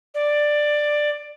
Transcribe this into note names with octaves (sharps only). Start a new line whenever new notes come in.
D5